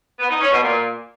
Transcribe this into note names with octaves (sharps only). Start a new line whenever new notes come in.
B3
D#4
C#4
B2
A#2